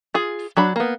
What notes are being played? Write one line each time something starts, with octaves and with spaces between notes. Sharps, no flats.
F4 G#4
F#3 D4 B5
A#3 B3